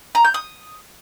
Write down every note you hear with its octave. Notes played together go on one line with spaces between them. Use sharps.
A#5
G6
D#6